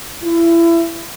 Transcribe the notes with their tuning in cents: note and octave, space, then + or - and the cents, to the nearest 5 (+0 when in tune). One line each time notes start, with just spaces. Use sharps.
E4 +25